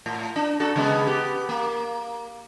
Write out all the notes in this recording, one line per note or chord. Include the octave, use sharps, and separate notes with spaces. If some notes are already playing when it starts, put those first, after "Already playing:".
A2
D4
D4 F#4 A4
C#3 G#3 B3
B3 G4
A#3